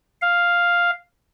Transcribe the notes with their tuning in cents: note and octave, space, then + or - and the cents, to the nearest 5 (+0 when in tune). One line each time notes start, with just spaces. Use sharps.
F5 +0